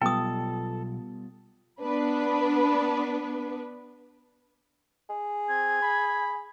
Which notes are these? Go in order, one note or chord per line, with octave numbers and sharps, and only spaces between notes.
B1 G3 B3 F4 A4 G5 D#6
B3 D4 B4
G#4
C4 G#6
B5